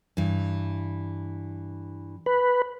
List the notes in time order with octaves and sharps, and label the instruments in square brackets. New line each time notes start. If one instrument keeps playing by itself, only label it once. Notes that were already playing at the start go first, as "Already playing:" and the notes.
[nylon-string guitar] G2 E3
[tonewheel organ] B4